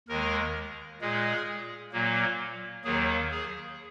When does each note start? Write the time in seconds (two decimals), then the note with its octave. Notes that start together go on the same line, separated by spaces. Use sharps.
0.08 D#2 D#3 G#3 A#4
1.01 A#2 G#3 G#4
1.92 A#2 F#3 A#3
2.84 D#2 D#3 F#3 A#3 G#4
3.31 G#4